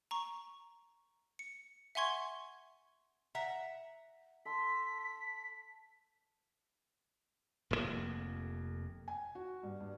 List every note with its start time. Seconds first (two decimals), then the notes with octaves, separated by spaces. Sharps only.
0.11 A#5 C#6
1.39 C#7
1.95 E5 F#5 G#5 C6 C#6 G#6
3.35 E5 F#5 A#5
4.46 A4 C6 B6
7.71 F1 F2 A2 A#3
9.08 G#5
9.35 F#4
9.63 G2
9.81 G2